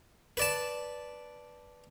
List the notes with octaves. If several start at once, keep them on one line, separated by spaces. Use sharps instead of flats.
B4 D5 A5